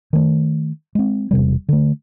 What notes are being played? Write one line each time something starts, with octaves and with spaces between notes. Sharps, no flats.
D#3 A3
G#3 C4
E1 C3 G3
D3 A3